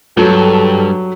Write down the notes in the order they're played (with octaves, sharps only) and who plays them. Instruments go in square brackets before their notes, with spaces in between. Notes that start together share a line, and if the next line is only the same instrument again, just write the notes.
[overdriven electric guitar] G2 [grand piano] F#3 [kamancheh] A4